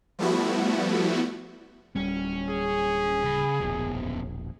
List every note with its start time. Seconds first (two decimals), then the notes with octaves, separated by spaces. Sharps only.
0.19 F3 G3 A3 B3 E4 F#4
1.96 D1 G3 C#4
2.50 G#4
3.24 C#3 B5
3.60 E1 A#1 B2 C#4